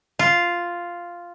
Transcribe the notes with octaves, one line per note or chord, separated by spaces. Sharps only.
F4